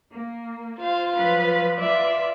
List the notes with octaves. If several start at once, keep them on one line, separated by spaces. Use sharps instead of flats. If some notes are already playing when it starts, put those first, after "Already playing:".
A#3
F4 C5 F5
F3 F#3 B4
F4 B4 D5 E5